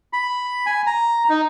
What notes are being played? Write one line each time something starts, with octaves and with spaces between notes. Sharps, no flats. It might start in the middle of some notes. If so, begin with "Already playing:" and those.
B5
G#5
A#5
D#4